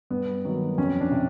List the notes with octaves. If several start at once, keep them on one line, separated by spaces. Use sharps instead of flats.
G2 B3
D#3 F#3
F2 C#4
D4
C3